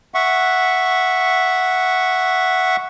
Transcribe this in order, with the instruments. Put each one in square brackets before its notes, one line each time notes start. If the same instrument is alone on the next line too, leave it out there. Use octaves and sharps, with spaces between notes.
[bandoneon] E5 F#5 C#6